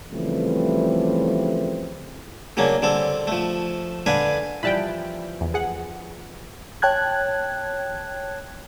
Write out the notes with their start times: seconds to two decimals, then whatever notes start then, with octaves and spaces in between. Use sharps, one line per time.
0.12 C#3 E3 F3 G3 A3 C4
2.57 C#3 F#3 A#3 C#4 D4
2.82 D3 G3 C4 A4
3.27 F3 A3
4.06 D3 D4 B4 F5 G#5
4.63 E3 F3 G3 G5 A5 B5
5.41 E2
5.54 G#4 F#5
6.82 C#5 G5 A5 F#6 G#6